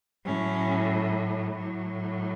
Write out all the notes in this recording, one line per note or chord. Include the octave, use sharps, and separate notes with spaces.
A2 F#3 C#4
A2 F#3